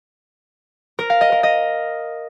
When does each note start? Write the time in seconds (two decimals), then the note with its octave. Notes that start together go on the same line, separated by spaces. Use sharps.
0.99 A#4
1.10 F5
1.21 D#5
1.32 A#4
1.43 D#5